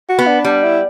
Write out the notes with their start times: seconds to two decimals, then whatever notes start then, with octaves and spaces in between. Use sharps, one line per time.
0.09 F#4
0.19 B3
0.27 D4
0.44 G3 D4
0.64 E4